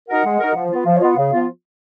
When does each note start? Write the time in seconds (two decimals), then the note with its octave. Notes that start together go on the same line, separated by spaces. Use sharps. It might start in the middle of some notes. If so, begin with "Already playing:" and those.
0.09 D#4 F#4 A#4 F#5
0.24 G#3
0.40 D#4 F#4 A#4
0.55 F3
0.70 B3 F4
0.85 F3 F5
0.96 C#5
1.01 B3 F4 D#5
1.10 F#5
1.16 C#3 F5
1.32 F3 B3 F4